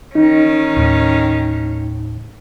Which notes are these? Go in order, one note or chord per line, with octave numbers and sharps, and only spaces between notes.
D#3 C#4 D#4
D#2 A2